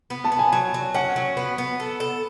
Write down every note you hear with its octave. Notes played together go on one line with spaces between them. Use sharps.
B3
A5
B3
G#5
F#3
F#3
C#4 F#5
F#3
B3
B3
A4
A4